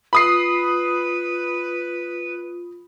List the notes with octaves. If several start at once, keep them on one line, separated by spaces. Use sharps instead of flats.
F4 B4 B5 D#6 C7